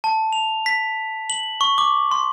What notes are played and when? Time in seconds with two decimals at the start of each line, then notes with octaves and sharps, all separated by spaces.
0.04 A5
0.33 F7
0.66 B6
1.30 F#7
1.61 C#6
1.78 D6
2.11 C6